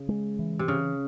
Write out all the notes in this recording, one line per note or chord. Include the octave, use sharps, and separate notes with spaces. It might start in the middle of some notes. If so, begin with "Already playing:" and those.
Already playing: C#3
G#3
E3
C3
C#3 C#4